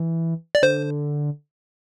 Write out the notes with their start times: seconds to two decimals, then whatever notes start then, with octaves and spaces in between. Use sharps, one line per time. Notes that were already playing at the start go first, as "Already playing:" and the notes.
Already playing: E3
0.55 D5
0.62 D3 C5